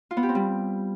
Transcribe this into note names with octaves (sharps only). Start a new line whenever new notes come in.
F4
B3
G4
C4
G3